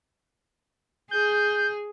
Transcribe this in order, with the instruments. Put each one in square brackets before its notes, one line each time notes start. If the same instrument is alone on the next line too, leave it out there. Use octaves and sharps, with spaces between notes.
[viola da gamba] G#4 [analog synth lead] G6